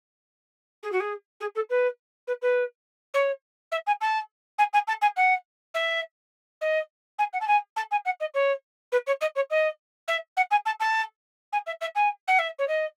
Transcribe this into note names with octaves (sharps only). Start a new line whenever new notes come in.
G#4
F#4
G#4
G#4
A4
B4
B4
B4
C#5
E5
G#5
A5
G#5
G#5
A5
G#5
F#5
E5
D#5
G#5
F#5
A5
G#5
A5
G#5
F#5
D#5
C#5
B4
C#5
D#5
C#5
D#5
E5
F#5
G#5
A5
A5
G#5
E5
E5
G#5
F#5
E5
C#5
D#5